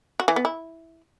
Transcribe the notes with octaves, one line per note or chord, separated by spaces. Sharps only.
F#4
E3
B3
E4